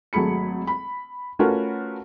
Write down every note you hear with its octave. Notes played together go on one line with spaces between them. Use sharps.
G#1 F#3 A3 G#4 B5 C#7
B5
A3 C#4 F4 F#4 A#4 B4